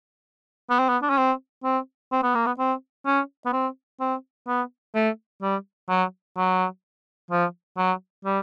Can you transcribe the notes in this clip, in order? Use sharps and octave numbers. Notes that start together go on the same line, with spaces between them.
B3
C4
B3
D4
C#4
C4
C4
C4
B3
A#3
B3
C4
C#4
B3
C4
C4
B3
A3
G3
F#3
F#3
F3
F#3
G3